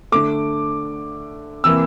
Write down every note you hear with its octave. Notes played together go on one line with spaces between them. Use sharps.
D3 A3 D6
C3 E3 A#3 E6